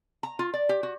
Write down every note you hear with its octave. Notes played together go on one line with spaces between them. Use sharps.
A#5
F4
D5
G4
F#4